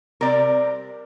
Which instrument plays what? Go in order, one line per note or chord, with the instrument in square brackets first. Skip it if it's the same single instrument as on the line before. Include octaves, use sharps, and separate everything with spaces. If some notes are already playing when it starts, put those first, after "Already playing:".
[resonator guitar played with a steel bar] C3 G3 C4 A#4 D5